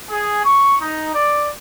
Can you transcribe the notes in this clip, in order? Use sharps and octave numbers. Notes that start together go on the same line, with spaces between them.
G#4
C#6
D#4
D5